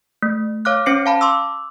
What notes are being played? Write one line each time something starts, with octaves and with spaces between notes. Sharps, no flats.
A3
C#5 F5 D6 F6 F#6
C#4 C5 C7 C#7
F5 A5 B5
C6 D6 E6